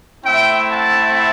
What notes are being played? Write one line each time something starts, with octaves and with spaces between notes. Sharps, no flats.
A3 C4 E4 E5 G5
F#5 A5